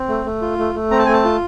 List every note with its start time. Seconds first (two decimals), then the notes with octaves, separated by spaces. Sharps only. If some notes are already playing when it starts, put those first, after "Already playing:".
Already playing: C4
0.09 A3
0.26 A3
0.42 F4
0.58 A3
0.74 A3
0.90 C4 A#5
0.99 A5
1.06 A3 G#5
1.14 A5
1.25 F4